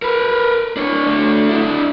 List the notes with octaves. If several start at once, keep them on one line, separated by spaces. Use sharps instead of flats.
A#4 B4
D4 C#5
A3 D4
D4 E4